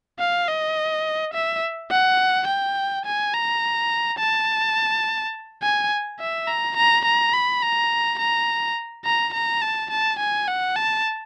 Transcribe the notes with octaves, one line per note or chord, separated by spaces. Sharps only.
F5
D#5
E5
F#5
G5
G#5
A#5
A5
G#5
E5
A#5
A#5
A#5
B5
A#5
A#5
A#5
A#5
A5
A5
G#5
F#5
A5